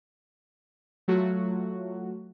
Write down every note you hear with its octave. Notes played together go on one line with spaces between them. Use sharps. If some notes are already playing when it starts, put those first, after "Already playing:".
F#3 A3 F4 F#4